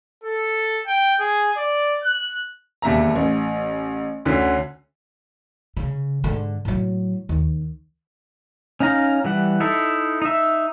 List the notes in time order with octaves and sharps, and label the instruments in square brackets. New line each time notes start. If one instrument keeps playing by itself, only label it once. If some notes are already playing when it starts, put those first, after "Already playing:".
[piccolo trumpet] A4
G5
G#4
D5
F#6
[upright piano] E1 D#2 E5 A#5
A1
D2 D3 C#4 B6
[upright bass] C#3
G#2 D3
A2 F#3
D#2
[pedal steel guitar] C#4 D#4 F5 A#5
E3 G3 F#5
D#4 E4 A4 E5
D#4 E5